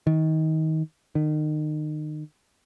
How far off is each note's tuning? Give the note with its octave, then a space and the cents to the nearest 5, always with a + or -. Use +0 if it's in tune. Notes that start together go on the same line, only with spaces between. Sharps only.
D#3 +25
D#3 -30